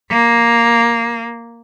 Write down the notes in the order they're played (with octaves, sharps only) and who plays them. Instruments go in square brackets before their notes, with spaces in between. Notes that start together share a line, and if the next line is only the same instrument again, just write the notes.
[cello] A#3